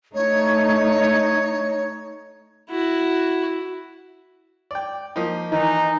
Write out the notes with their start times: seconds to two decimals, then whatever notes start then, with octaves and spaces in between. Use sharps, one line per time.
0.14 A3 D#4 C#5
2.70 E4 F#4
4.71 D5 G5
5.16 F3 A#3 D#4
5.52 D#3 E3 D#4